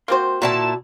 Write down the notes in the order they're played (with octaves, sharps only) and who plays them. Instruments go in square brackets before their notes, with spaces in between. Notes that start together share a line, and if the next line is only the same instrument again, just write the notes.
[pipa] A#3 C4 C5 [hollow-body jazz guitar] F#4 C6
[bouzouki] A#2 E4 A5 [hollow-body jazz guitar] F#4 D5